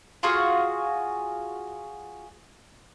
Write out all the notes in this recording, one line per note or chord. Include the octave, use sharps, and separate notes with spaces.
F4 F#4 G#4 C#6